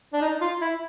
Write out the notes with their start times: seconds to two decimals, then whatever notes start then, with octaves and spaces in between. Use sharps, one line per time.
0.13 D4
0.21 D#4
0.41 F4
0.61 E4